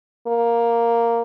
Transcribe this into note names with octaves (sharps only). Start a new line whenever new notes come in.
A#3